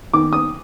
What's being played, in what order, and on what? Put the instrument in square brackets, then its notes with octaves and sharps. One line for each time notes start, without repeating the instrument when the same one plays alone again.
[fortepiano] D#3 D6
D#6